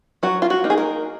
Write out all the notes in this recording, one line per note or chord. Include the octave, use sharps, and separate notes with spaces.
F#3 F#4
F4
F#4
A#3 D#4
G#4
A#4